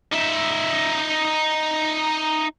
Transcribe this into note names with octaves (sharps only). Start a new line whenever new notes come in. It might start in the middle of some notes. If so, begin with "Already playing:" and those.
D#4 E5